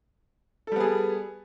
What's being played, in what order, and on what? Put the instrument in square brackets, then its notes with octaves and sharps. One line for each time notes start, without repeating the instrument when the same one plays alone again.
[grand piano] A4
G3
B3
G#4